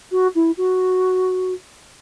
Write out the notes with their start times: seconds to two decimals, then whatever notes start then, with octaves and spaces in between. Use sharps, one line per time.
0.11 F#4
0.35 E4
0.57 F#4